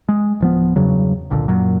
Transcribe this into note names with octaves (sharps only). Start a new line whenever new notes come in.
G#3
D1 F3 B3
E2 G2 C#3 F#3
G#1 C#2 A#2 D3
F#2 A#2 F#3